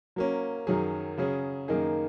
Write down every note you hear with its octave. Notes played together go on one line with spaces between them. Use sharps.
F#3 A#3 C#4
F#2 D#3 F#3 C#4 G#4
C#3 F#3 C#4 G#4
F#2 D#3 A#3 D#4 G#4